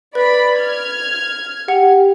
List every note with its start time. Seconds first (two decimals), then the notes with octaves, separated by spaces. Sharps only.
0.15 B4 D5 B5
0.57 F6 G#6
1.68 G4 F#5